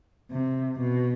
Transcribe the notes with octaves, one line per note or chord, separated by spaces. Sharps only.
C3
B2